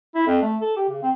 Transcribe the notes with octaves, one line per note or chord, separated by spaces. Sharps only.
E4
F2
A3
A4
G4
C#3
C4